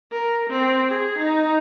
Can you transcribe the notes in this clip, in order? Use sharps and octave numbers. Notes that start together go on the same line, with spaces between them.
A#4
C4
G#4
D#4